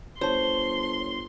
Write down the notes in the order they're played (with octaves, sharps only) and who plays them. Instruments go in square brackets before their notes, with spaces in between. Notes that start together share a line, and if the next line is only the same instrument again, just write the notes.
[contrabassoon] G1 [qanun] C5 [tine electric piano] C#5 A5 [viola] C6